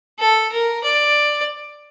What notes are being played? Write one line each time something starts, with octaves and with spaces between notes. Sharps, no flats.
A4
A#4
D5